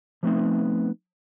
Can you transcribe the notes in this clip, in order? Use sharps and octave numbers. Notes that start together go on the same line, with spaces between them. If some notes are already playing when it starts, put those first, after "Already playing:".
F3 G3 A3 B3 C4 D#4